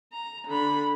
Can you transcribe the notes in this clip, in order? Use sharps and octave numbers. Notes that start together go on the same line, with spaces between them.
A#5
D3 B5